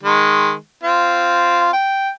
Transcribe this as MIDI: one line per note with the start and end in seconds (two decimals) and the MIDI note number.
0.03 0.53 51
0.03 0.53 56
0.83 1.69 60
0.83 1.69 65
1.73 2.10 79